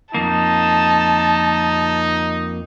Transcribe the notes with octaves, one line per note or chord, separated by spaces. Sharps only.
F2 A#3 D#4 A5